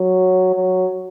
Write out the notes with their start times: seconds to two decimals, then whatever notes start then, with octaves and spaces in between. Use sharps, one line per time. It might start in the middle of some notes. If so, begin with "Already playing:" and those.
Already playing: F#3
0.56 F#3